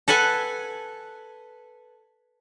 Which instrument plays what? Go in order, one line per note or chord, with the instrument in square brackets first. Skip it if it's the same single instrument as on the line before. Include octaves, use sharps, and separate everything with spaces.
[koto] A4 B4 F#5 G#5